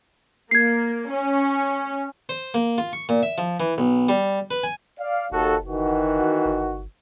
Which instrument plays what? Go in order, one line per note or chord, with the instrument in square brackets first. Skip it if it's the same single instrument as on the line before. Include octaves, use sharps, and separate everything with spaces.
[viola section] A#3 [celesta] G#6 C7
[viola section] C#4
[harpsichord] C5
A#3
F4
C#6
A#2
E5
F3
E3
B1
G3
B4
G#5
[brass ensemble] D5 F5
[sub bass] F#1 [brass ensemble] D#2 F#4 A4
[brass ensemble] D#3 E3 F#4
[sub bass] G1